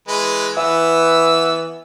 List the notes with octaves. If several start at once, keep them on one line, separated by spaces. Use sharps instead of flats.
E3 G#3 B4
E3 B3 E6